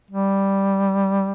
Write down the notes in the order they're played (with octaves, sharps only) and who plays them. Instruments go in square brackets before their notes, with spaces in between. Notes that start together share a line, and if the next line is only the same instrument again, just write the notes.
[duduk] G3